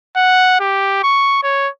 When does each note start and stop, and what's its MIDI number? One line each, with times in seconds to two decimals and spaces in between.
0.16 0.56 78
0.60 0.99 67
1.03 1.40 85
1.43 1.69 73